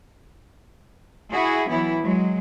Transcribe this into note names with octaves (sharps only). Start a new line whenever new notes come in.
E4 F#4 G#4
E3 F#3 B3 E4
F#3 G#3